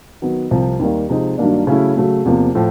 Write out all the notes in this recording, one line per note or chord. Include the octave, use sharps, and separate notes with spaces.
D#3 F#3 B3
C2 C3 F3
D#2 D#3 G3 A#3
C3 F3 G#3 C4 D#4
G2 D#3 F#3 A#3 D4
C#3 F#3 A3 C#4 E4
C#3 F#3 A3
E2 C3 F3 A#3
A2 F3